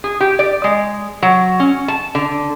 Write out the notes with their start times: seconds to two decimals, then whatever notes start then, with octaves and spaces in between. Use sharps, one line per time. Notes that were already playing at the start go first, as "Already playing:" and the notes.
0.04 G#4
0.20 G4
0.39 D5
0.64 G#3
1.22 F#3
1.60 C#4
1.88 A5
2.15 D3